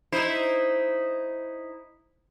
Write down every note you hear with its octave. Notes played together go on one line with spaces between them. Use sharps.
D#4 E4 C5